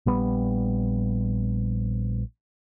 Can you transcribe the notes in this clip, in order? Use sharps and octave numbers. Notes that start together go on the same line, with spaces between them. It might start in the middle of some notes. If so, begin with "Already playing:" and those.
A#1 G3 B3